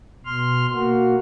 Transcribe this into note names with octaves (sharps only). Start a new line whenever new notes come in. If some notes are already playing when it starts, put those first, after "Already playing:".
B2 C6 F6
A#3 F#4